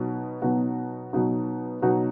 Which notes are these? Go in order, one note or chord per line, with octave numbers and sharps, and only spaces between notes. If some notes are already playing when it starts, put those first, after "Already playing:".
Already playing: B2 F#3 B3 D#4 F#4
B2 F#3 B3 D#4 F#4
B2 F#3 B3 D#4 F#4
B2 F#3 B3 D#4 F#4